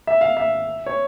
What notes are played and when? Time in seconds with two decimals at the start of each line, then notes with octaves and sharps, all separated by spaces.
0.07 E5
0.21 F5
0.37 E5
0.86 C#5